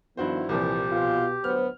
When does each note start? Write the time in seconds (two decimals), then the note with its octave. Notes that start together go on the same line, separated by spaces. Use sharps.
0.17 G2 D#3 F3 B3 E4 F#4 C5
0.49 C2 A#2 E3 F3 G4
0.91 B2 F4
1.44 D2 F#3 B3 C5 F6